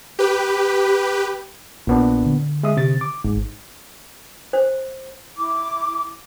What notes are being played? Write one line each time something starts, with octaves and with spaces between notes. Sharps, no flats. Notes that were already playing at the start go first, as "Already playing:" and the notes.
G4 B4
A#1 A#2 B3 D4
D3
G#3 E5 D#6
C3 A6
D6
G#1 G#2
C5
E4 D6